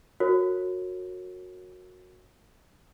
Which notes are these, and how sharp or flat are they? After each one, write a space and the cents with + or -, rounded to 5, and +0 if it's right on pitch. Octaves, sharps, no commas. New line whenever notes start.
F#4 -15 A#4 -25 C#5 -20